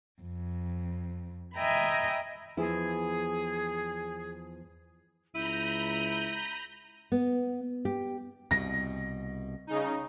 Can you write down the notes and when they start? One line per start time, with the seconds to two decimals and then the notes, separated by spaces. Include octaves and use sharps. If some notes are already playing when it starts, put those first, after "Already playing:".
0.22 F2
1.56 D#5 E5 G5 G#5 A#5 B5
2.57 E2 F3 E4 G#4
5.35 C#2 E4 A#5 B5 G6 D#7
7.12 B3
7.85 G4
8.51 C2 B2 A#6
9.67 C#3 D#4